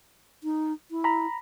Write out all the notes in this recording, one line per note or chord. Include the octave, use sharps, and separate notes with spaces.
D#4
E4
A#5 B5